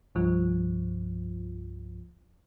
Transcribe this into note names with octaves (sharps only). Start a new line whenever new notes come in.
C2 G2 F3